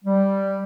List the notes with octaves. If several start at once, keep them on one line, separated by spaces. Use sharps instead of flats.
G3